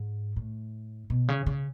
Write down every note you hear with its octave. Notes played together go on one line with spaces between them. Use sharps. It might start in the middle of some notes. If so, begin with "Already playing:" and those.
Already playing: G#2
A2
B2
C#3
C#3